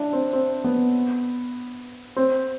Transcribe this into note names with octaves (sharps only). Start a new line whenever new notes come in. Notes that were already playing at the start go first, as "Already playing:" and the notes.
Already playing: D4 E4
C4
C4
B3
C4